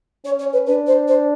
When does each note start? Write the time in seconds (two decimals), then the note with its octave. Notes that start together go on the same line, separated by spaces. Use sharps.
0.25 C#4 C#5
0.39 C#5
0.53 B4
0.67 D4 B4
0.87 C5
1.08 C5